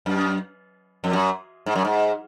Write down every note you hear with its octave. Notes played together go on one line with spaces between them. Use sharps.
F#2
F2
F#2
G#2
F#2
G#2